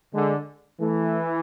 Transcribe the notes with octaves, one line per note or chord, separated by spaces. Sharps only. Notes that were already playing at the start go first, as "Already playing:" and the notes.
D3 G#3
E3 A3